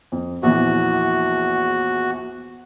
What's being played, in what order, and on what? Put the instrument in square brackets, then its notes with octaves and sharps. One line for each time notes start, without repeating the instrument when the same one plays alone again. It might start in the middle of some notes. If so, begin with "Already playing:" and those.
[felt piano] F2
[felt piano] A#1 E2 E3 [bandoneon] F#4